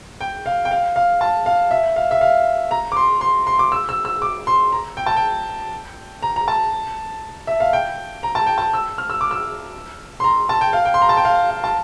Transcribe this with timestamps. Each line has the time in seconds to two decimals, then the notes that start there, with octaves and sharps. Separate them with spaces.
0.21 G5
0.46 F5
0.65 G5
0.71 F5
0.96 F5
1.21 A5
1.46 F5
1.71 E5
1.96 F5
2.11 E5
2.21 F5
2.71 A#5
2.92 D6
2.97 C6
3.21 C6
3.47 C6
3.59 D6
3.72 E6
3.89 E6
4.05 E6
4.22 D6
4.47 C6
4.72 A#5
4.97 G5
5.06 A5
5.16 G5
6.23 A#5
6.36 A#5
6.48 A5
7.47 E5
7.60 F5
7.73 G5
8.23 A#5
8.35 A5
8.46 G5
8.58 A5
8.74 E6
8.98 F6
9.10 E6
9.21 D6
9.31 E6
10.20 C6
10.24 A#5
10.49 A5
10.61 G5
10.73 F5
10.85 G5
10.94 C6
11.02 A#5
11.09 A5
11.17 G5
11.25 F5
11.49 F5
11.64 A5